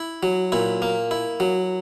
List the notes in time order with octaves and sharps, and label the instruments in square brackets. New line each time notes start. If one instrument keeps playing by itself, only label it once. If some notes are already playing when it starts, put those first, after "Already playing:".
Already playing: [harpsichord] E4
F#3
A#2 E4
A#3
E4
F#3